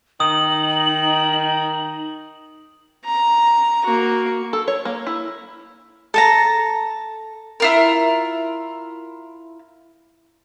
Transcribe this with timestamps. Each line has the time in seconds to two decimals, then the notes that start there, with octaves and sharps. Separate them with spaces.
0.20 D#3 D#4 D#6 F#7
3.05 A#5
3.85 A#3 F#4
4.53 A4
4.68 C#5
4.85 A#3
5.07 E4
6.14 A4 A5 A#5
7.60 E4 F4 A#4